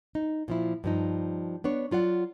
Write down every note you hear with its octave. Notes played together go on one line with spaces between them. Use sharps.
D#4
A#2 F3 E4
G2 F3 D#4
B3 D4 C#5
F#3 F4 D5 F#5